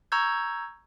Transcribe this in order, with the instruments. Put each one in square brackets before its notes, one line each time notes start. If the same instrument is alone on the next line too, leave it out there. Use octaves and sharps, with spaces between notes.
[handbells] A#5 C#6 E6 G6 G#6